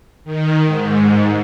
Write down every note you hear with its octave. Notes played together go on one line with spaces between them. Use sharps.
D#3
G#2